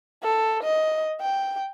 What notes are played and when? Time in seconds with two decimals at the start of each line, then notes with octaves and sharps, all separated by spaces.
0.23 A4
0.63 D#5
1.21 G5